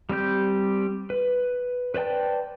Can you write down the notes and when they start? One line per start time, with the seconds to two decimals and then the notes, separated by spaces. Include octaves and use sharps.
0.09 G3 C4 G4 G6
1.10 B4
1.94 B4 C5 D5 G5 A5